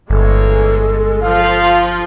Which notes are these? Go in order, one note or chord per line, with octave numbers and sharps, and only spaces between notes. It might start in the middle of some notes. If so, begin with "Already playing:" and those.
G1 E3 G#3 A#3 A4 C#5
F3 F4 F5